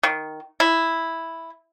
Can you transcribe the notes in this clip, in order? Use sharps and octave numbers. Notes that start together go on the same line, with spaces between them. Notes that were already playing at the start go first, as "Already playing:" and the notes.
D#3
E4